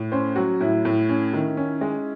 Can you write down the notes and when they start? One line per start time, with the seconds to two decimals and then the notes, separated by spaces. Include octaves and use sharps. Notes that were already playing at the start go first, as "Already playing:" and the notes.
Already playing: A2
0.12 C#4 C5
0.36 F#3 F#4
0.60 A2 E4
0.85 A2
1.09 C#4
1.34 D#3
1.57 C#4
1.81 G#3